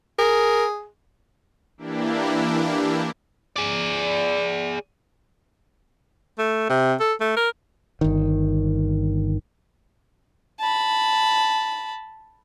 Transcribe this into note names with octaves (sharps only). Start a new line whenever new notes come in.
G#4 A#4
E3 A#3 D4 E4 G4
G#4 D5
A3
C3
A4
A3
A#4
G1 D#3
A5 B5